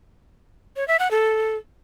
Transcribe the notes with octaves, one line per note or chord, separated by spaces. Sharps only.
C#5
E5
F#5
A4